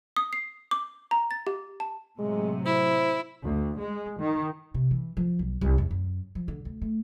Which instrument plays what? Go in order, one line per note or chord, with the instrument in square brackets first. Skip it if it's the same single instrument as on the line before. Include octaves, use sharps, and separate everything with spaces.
[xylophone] D#6
C7
D6
A#5
A6
G4
A5
[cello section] A2 C3 F#3 [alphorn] G#3
[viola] E4 [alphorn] C5
[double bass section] D2
G#3
D#3
[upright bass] C3
E3
F3
B1
C2
E2
F#2
F3
D3
D2
A3